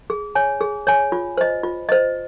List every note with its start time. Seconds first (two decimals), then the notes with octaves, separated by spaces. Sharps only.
0.10 G#4
0.35 C#5 G#5
0.61 G#4
0.87 C#5 G#5
1.12 F4
1.37 C5 D#5
1.63 F4
1.89 C5 D#5